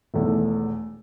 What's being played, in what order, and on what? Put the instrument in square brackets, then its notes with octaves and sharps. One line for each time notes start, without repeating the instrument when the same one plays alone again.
[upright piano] E1 E2 D#3 [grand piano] A3